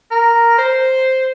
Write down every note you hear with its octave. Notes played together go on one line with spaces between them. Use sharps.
A#4
C5